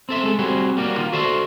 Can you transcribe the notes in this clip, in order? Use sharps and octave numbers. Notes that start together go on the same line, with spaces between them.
C4 A4 E5
G#3 A4
G3 C4 F#4 G#4
G3 A#3 F#4
D#3 F4
F#4 A4 C5 D5 E5